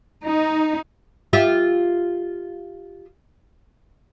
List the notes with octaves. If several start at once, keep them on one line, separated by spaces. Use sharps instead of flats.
D#4
F4 G4 E5